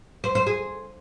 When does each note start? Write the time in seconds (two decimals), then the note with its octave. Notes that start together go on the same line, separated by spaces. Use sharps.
0.24 C5
0.35 C5
0.47 G#4